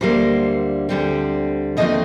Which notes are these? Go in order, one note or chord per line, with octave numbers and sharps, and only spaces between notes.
D2 D3 G3 A#3 C5
D2 D3 G3 C4
D#2 D3 F3 A3 C4 D#5